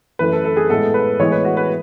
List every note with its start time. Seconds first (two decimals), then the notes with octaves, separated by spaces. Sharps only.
0.19 F#2 E3 A3 B4
0.32 A4
0.44 A4
0.57 G#4
0.70 A2 G#3 B3 A4
0.94 B4
1.19 A2 E3 G#3 B3 C#5
1.32 B4
1.45 F#4
1.57 B4